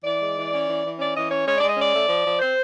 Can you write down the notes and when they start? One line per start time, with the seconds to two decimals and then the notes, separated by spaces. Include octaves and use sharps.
0.04 E3 D5
0.20 G#3
0.36 E3
0.52 C#4
0.68 E3
0.83 E3
0.99 C#4 D5
1.14 E3 D#5
1.30 C#4 C#5
1.46 G#3 C#5
1.58 G#3 D5
1.69 D#5
1.77 C#4 D5
1.93 A3
2.08 F3
2.24 F3
2.40 C4 C5